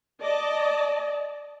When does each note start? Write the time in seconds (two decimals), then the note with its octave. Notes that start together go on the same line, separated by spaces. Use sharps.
0.21 D5 D#5 A5